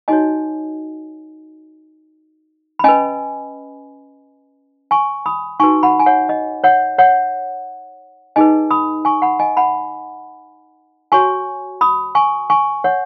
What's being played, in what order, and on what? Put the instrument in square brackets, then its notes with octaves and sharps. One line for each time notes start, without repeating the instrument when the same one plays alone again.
[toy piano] D#4 F#4 C#5 D#5 G#5
B5
C#4 B4 D#5 G#5
G#5 C#6
B5 D#6
D#4 F#4 B4 G#5 C#6
F#5 B5
G#5
C#5 F#5
D#5
C#5 F#5
C#5 F#5
D#4 G#4 B4 D#5 G#5
B5 D#6
G#5 C#6
F#5 B5
D#5 G#5
F#5 B5
F#4 C#5 G#5 C#6
B5 D#6
G#5 C#6
G#5 C#6
C#5 F#5